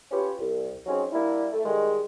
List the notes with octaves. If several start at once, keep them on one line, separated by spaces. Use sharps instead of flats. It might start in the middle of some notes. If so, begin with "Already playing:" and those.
C#4 F4 G4 B4 C#5
C2
F#3 C4 C#4 D#4 G#4
G3 A#3 D4 E4
A3
D#3 G3 G#3